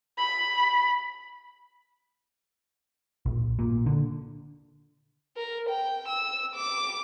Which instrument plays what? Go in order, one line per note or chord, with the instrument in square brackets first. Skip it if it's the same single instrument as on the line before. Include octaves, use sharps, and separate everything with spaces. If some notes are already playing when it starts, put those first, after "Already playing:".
[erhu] B5
[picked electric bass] A#1
A#2
D3
[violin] A#4
G5
E6
D6